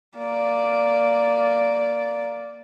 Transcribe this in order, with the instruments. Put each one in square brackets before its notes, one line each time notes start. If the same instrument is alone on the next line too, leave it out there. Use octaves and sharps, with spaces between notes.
[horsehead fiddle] A#3 D5